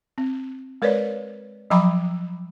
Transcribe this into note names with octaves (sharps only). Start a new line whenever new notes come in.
C4
G#3 A#4 B4 C#5 D5
F3 F#3 G5 A#5 B5 D6